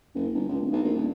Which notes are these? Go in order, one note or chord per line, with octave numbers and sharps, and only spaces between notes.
F#1
G1
C#2
D1
B1
A#1
D#1